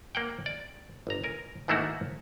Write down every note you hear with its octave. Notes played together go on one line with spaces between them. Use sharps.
A#3 F#5 G5
D5
G1 A#5
A#4 G#5
G#2 D#3 A3 A#3 E4 F#4